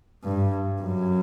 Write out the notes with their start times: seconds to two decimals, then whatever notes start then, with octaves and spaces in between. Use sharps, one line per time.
0.24 G2
0.81 F#2